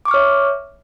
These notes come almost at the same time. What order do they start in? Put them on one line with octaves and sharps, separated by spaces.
D6 C#6 F6 C#5 E5